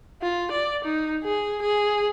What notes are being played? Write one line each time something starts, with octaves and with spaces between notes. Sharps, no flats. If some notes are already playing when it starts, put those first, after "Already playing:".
F4
D5
D#4
G#4
G#4